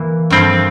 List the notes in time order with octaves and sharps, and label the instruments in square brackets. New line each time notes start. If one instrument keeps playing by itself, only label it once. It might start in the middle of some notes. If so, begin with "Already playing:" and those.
Already playing: [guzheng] E3 A#3 E4
[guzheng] G2 F3 A#3 E4 A4 [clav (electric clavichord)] C4